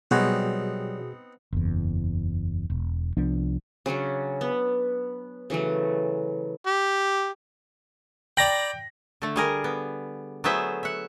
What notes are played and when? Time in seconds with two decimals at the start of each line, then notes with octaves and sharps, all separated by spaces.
0.11 B2 F#3 G3 B3 C4 D#4 F#4 G#4
1.53 F#1 E2
2.70 E1
3.17 C2 F3 B3 D4
3.86 C#3 F#3 C#4 D4
4.41 B3
5.50 C#3 E3 F#3 A3
6.67 G4
8.37 D5 G5 A#5 B5 A#6
9.22 D3 A3
9.36 G3 G#4 A#4
9.64 B3
10.44 F#3 A3 B3 G#4 C5 E5
10.83 E5 F#5